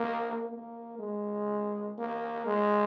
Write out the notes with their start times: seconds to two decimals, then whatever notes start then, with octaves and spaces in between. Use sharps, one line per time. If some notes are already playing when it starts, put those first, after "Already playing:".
Already playing: A#3
0.50 A#3
0.99 G#3
1.98 A#3
2.46 G#3